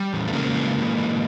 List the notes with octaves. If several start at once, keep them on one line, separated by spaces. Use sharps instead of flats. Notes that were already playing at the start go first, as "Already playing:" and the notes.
Already playing: G3
E2
A3
C#3 G#3 A#3
E3
E3
E3